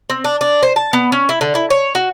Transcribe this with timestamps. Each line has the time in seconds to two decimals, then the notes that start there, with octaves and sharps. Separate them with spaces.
0.10 C4
0.24 D4
0.41 D4
0.63 C5
0.76 A5
0.93 B3
1.12 C#4
1.29 E4
1.41 D3
1.55 E4
1.70 C#5
1.95 F#4